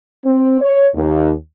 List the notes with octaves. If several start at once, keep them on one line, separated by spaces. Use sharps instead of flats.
C4
C#5
D#2